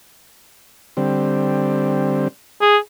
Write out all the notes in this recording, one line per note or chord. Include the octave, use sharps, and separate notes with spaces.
D3 G3 C4
G#4